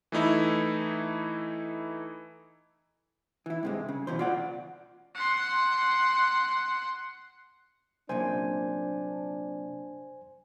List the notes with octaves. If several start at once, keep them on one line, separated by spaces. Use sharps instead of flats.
E3 A3 D#4 E4
E3 E4
G2 C3 G#3
C#3
B2 E3 C5
F4 D5 F#5
F#5 C6
C2 F#2 A#2 D4 C5 G#5